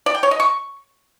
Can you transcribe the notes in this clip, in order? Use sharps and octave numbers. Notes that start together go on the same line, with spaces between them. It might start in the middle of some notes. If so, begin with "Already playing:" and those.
D5
G5
C#5
D#5
C#6